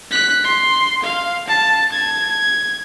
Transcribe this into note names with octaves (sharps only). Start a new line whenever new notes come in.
F#6 B6
C6
F5
A5
G#6